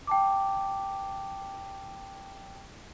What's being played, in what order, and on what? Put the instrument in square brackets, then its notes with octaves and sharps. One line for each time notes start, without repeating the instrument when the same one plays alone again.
[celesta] G5 A5 D6